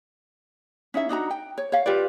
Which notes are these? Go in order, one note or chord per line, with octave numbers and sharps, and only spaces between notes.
C#4 D#4 E4 E5
D4 D#4 F#4 A#5
G5
C#5
C#5 F5
F4 G4 B4 D5